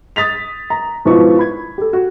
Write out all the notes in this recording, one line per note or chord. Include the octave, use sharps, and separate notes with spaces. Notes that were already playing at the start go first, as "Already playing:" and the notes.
D#6 A6 B6 F7
A#5
G#2 B2 F3 E4 C#6
B5 G#6
G4 A4
F#4